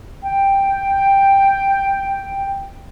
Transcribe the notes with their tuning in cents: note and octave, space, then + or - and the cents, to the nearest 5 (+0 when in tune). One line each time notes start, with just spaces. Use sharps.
G5 +5